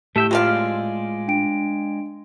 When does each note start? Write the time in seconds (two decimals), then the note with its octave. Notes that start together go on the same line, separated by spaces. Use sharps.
0.16 A2 A3 G4 E5 G5 A5 E6
0.31 C3 F3 G#3 F4 D5 F5
1.28 D4 G5 D7